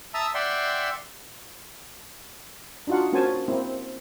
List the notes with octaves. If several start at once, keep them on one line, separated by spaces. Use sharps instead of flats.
E5 A5 A#5 D#6 E6
D5 E5 F#5 G5 C6
D4 D#4 F4 F#4 F#5
A#3 C#4 F#4 C5 G#5 A5
A#3 C4 E4